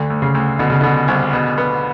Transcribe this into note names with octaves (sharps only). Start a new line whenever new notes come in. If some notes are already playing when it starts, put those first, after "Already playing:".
Already playing: D2 D3
D2
C#3
D2
B2 D3
C#3
B2 D3
C2
B2
B3